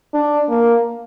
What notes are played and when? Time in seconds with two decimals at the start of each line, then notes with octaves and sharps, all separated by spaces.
0.14 D4
0.49 A#3